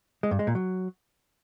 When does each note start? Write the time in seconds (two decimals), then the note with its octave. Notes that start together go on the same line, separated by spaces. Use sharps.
0.23 G#3
0.31 G2
0.39 G#3
0.47 A#2
0.55 F#3